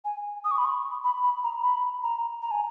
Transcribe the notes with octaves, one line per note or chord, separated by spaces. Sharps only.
G#5
D#6
C#6
B5
C#6
B5
B5
A#5
B5
A#5
A#5
G#5